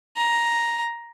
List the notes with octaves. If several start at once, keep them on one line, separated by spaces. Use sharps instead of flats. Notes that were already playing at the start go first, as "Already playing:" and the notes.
A#5